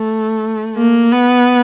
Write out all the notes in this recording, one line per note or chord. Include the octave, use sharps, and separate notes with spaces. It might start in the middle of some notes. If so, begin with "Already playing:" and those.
Already playing: A3
A#3
B3